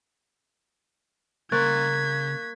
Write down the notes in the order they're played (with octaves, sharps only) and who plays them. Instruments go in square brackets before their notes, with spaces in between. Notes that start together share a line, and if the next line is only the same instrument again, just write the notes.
[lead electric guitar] C#3 C6 [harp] A#3 [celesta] C#6 F#6 A6 [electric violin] G#6 B6